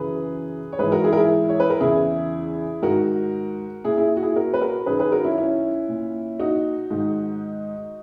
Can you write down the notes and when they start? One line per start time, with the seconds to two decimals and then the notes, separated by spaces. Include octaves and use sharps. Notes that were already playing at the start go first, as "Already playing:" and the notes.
Already playing: F#2 C#3 E3 G#4 B4
0.73 C#5
0.79 G#2 E3 G#4 B4
0.92 F#4 A#4
1.04 E4 G#4
1.13 A#4
1.17 E4 G#4
1.49 C#5
1.60 B4
1.70 A#4
1.80 E2 C#3 E3 E4 G#4
2.82 G#2 D#3 F#4 A#4
3.85 A#2 E4 G#4
3.97 E4 G#4
4.17 F#4
4.23 E4 G#4
4.35 F#4 A#4
4.54 B4
4.61 F#4 A#4
4.86 F#2 D#3 G#4 B4
4.99 G#4 B4
5.12 F#4 A#4
5.24 C#4 E4
5.38 C#4 E4
5.89 A#2
6.39 D#4 F#4
6.91 G#2 D#3